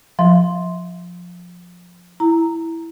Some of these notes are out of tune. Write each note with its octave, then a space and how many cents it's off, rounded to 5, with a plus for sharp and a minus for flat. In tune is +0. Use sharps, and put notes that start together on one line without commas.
F3 +20 E5 -30 C6 +0
E4 +0 A#5 -5